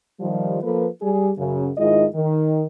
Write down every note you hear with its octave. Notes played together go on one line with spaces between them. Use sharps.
D#3 F3 G3
F3 A#3 A4 B4
G3 G#4
F#2 C#3
G#2 D#3 G#3 E4 F4 D#5
D#3